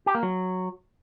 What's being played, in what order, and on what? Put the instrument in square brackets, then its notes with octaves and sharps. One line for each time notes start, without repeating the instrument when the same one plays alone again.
[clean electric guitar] G4
A#3
F#3